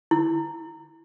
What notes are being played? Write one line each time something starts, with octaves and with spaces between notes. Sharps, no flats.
E4